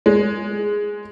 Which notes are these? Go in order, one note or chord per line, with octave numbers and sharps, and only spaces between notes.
G#3